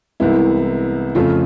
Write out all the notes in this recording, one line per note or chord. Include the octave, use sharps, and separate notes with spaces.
C2 C3 E3 G#3 B3 E4
F2 C#3 F3 A3 F4